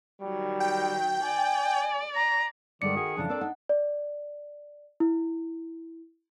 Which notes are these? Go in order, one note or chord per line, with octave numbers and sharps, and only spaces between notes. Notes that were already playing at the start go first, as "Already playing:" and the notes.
D#3 F#3 G3
G5
D5 G#5
A#5
G2 D3 D#3 G#3 D5 C#7
F#4 G#4
F2 C#3 E3 D4
C4 A4 A#4 D5
D#4 F#5
D5
E4